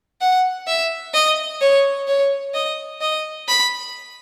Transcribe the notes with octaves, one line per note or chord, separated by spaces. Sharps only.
F#5
E5
D#5
C#5
C#5
D#5
D#5
B5